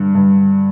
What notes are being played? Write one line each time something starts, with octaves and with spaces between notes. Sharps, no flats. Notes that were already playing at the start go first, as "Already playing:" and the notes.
Already playing: G2 D3
G2